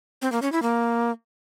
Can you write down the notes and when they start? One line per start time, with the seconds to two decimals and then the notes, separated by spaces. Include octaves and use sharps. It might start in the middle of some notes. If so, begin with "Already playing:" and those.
0.22 C4
0.32 A#3
0.42 C#4
0.52 E4
0.62 A#3